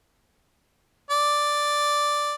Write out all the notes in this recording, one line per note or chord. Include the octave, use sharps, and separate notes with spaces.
D5